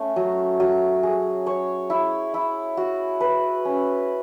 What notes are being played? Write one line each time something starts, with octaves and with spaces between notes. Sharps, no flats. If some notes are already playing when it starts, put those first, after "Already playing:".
Already playing: A3 C#4
F#3
F#3
G#4
C#5
E4
E4
F#4
B4
C#4